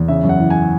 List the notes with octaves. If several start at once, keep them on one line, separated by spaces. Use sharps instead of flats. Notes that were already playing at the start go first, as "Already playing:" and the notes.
Already playing: E2
C#3 E5
F#2
F#5
E3
G#5